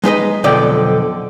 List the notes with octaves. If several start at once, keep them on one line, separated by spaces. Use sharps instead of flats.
G#3 D#4 B4 D#5
B1 F2 D3 F3 D5 G5